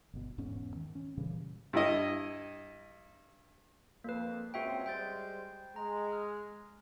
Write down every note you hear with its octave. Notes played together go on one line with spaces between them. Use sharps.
G1 B2
E1 G#2 B3 C#4
D#3
C#4
A#2 C#3 E3 G3
G2 E4 D#5
F2 A#3 B4
C#2 C4 F#4 E5 G5
G3 G#3 C5 G5 G6 A6
G#3 A#5
F6